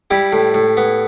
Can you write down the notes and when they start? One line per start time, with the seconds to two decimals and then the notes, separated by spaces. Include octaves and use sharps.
0.11 G3 E4 G4
0.33 A2
0.54 A2
0.77 B3